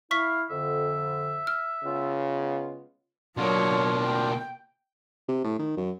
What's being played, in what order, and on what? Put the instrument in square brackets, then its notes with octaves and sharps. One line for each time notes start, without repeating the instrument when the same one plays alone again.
[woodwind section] E4 [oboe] F5 [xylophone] C#6 B6
[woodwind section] F2 D3 [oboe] E5
[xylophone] F6
[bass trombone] C#3 [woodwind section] G#3 B3 F4
[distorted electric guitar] B2 A#3 [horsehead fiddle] F#3 C#5 [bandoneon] D4 F4
[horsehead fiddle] G5
[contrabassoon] C3
A2
D#3
F#2